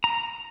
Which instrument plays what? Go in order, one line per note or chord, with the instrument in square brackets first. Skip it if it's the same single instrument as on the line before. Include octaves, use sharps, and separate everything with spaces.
[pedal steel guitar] A#5